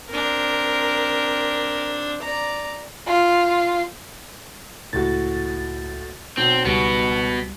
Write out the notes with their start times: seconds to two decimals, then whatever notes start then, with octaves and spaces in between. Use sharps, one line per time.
0.10 C4 D4 A#4
2.22 D5 A#5
3.07 F4
4.93 C#2 A2 F#4 A6
6.37 B1 C4
6.65 C#2 B2 G3 B3